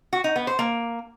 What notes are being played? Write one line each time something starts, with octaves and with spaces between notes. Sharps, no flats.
F#4
D#4
B3
C5
A#3